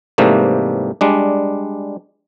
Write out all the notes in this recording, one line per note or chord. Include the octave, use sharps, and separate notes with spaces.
G#2 C3 E3 G3 A3 A#3
G3 G#3 D4